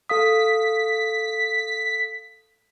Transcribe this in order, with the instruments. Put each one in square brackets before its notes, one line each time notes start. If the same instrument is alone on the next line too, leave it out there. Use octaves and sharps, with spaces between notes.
[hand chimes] A4 F5 D#6 [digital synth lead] B6